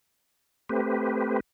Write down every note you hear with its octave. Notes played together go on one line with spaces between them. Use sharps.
A3 C4 G4 B4